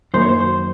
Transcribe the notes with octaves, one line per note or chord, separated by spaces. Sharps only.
F#2 D#3 A#3 C5
C#5
C5
C5